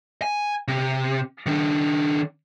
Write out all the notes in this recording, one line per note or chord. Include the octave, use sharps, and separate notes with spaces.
G#5
C3
D#3 D4